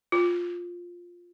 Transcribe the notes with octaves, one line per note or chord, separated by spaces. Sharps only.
F4